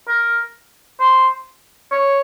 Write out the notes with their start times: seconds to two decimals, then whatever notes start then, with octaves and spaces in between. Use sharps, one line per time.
0.08 A#4
0.99 C5
1.91 C#5